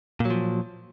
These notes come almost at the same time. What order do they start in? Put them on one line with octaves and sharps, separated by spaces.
A#2 F#3 F3